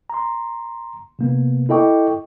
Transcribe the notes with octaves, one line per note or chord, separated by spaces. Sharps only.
A#5 C6
C3 A#3 B3
E4 A4 D#5 G5 C#6 D6